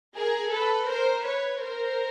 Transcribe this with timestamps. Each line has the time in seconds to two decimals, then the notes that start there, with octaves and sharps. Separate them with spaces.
0.16 G#4 A#4
0.52 A4 B4
0.89 A#4 C5
1.25 B4 C#5
1.61 A#4 C5